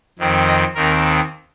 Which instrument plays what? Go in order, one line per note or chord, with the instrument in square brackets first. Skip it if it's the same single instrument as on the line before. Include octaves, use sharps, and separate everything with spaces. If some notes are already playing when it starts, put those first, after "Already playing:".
[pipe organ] F2 D#3 C4
D#5
D#2 D#3 C4 A#4